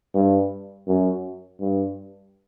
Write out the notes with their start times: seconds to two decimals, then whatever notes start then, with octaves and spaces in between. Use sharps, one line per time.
0.14 G2
0.88 F#2
1.61 G2